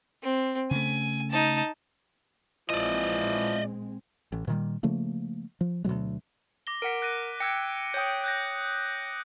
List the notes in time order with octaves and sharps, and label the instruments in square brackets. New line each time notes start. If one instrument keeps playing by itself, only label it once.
[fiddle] C4
[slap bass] C#3 A3 [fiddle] G#5
[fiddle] D#4 A5
[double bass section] A#1 G#3 C4 [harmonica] E3 F3 [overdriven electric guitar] D5 D#5
[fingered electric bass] A1
A#2 D#3 G3
C#3 F3 A3 A#3
F3
D2 B2 F#3 G#3
[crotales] D6 A#6 G7
[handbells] A#4 F#5 [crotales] B6 D7
[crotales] F#6 A#6 D#7
[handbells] G5 E6 G#6 [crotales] A#6 C#7
[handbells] C#5 G5 [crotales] D#6 G6
[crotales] F#6 G6 A#6